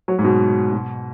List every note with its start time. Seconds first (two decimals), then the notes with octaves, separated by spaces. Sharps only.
0.08 F#3
0.19 G#2
0.24 B2
0.72 B2